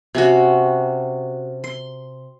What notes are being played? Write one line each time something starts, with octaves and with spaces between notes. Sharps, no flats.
C3 C#4 F#4
C6